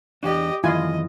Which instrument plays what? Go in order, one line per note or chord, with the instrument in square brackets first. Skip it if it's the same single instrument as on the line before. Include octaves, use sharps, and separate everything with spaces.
[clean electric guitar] E2 D4 [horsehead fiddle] G4 D#5
[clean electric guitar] F#2 D#3 E3 [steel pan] E4 F4 G#5 [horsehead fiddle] D#5